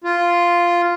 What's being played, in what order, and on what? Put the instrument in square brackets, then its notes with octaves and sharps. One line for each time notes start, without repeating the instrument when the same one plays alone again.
[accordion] F4